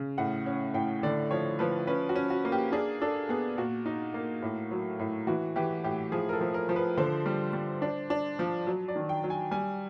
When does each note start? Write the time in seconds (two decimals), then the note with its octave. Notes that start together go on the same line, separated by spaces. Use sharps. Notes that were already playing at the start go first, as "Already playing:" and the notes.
Already playing: C#3
0.18 A2 F#5
0.46 C#4
0.74 A2 G5
1.03 D3 D5
1.31 F3 C#5
1.59 F3 B4
1.87 C#4 B4
2.09 F#4
2.16 C#4
2.30 F#4
2.45 A#3
2.52 G4
2.72 D4 G#4
3.01 D4 A4
3.29 B3 G#4
3.58 A#2 F#4
3.86 D#4
4.14 A#3
4.43 A2
4.71 F#3
4.99 A2
5.27 E3 F#4
5.56 E3 G4
5.84 A2 G4
6.12 F3 G#4
6.29 A#4
6.33 A4
6.41 F3
6.54 A#4
6.69 F3
6.76 B4
6.97 D3 C5
7.26 G3
7.53 G3
7.82 D4
8.10 D4
8.39 F3
8.67 F#3
8.88 D5
8.96 D#3
9.09 G5
9.24 F#3
9.30 G#5
9.51 G3 G#5